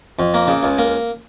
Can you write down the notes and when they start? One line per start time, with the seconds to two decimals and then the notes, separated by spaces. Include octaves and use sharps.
0.19 F2
0.34 A#3
0.47 C#3
0.63 C#2
0.78 A#3